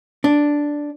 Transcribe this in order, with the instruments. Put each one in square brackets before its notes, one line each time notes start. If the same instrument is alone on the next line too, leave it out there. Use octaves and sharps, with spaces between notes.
[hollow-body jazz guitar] D4